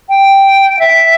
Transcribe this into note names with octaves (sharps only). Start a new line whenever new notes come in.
G5
E5